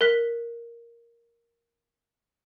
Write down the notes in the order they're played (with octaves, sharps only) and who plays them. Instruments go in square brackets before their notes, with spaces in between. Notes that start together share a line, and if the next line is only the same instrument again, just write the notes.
[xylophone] A#4 F#6 B6